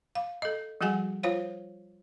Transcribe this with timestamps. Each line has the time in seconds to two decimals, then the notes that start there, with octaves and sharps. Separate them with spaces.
0.15 F5
0.42 A4 D#5
0.81 F3 G3 F#4 G#4 F#5 G#5
1.23 F4 C5 C#5 F5